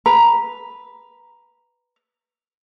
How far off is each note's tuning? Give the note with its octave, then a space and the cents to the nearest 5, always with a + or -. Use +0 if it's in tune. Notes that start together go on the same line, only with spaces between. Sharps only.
B4 +0 A#5 +0